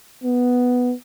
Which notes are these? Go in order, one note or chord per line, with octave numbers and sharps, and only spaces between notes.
B3